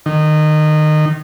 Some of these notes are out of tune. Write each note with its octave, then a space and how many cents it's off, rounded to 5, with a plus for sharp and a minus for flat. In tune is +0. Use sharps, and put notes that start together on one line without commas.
D#3 -25